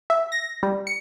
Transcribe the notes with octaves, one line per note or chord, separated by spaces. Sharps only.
E5
A#6
G3
C#7